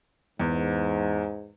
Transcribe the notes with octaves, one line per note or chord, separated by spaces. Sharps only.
E2 G#2